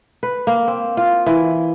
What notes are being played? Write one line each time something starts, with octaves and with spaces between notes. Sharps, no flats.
B4
A#3
C4
F4
E3